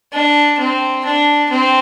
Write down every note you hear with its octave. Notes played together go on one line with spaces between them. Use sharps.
D4
C4
D4
C4